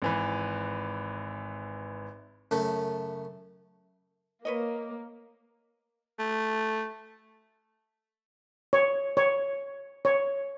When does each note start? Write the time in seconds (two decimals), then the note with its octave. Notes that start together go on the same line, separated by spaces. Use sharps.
0.02 G#1 E3 B4
2.51 F#2 C#3 A3 A4
4.45 A#3 B4 C#5 D#5
6.19 A3
8.73 C#5
9.17 C#5
10.05 C#5